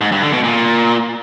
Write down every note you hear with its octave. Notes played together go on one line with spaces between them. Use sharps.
G#2
G2
D3
B2
A#2